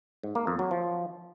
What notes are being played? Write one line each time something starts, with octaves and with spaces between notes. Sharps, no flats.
G#2
A#3
F2
F#3
F3